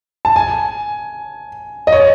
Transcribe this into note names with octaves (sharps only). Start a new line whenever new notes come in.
A5
G#5
D#5
C#5